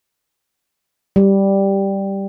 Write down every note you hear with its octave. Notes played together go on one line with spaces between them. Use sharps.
G3